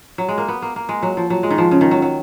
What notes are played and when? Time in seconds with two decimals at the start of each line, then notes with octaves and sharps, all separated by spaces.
0.18 F#3
0.28 G#3
0.38 A#3
0.48 B3
0.62 A#3
0.76 A#3
0.89 G#3
1.03 F#3
1.17 F3
1.30 F#3
1.43 G#3
1.51 D#3
1.58 F3
1.71 C#3
1.81 D#3
1.91 F#3
2.02 F#3